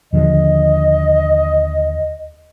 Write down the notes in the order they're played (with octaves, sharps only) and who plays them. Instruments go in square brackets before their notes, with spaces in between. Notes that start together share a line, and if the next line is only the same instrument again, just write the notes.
[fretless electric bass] D#2 D3 F3 [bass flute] D#5